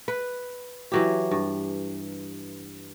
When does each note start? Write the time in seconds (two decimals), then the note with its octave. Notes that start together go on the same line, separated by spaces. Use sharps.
0.08 B4
0.92 E3 F#3 G4
1.31 G2